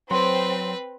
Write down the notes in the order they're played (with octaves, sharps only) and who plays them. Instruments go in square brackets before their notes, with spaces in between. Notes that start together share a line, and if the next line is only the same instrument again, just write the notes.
[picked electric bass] F#3 [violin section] C4 [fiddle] B4 [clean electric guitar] C6